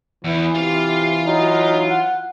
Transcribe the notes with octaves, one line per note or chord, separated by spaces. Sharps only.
E2 E3
C3 F4 F5
F#3 D#4
F#5